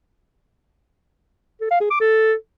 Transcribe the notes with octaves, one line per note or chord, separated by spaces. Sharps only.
A4
F5
G#4
D6
A4